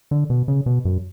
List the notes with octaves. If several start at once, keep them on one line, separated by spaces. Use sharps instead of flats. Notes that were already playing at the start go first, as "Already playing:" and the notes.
D3
B2
C#3
B2
F#2